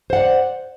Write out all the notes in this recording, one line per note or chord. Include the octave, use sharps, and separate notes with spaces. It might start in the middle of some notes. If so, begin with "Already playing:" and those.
C5 D5 F#5